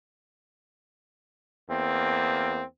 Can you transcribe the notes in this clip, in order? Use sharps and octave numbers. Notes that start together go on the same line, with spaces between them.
E2 A#3 C4